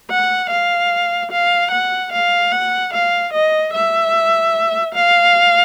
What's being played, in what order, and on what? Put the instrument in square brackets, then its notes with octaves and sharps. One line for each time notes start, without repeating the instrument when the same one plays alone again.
[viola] F#5
F5
F5
F#5
F5
F#5
F5
D#5
E5
F5